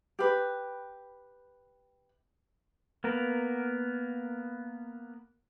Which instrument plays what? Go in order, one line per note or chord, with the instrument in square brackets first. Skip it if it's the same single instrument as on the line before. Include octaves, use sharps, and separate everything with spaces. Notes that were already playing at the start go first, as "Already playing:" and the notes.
[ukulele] G4 B4
[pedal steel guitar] A#3 B3 A#4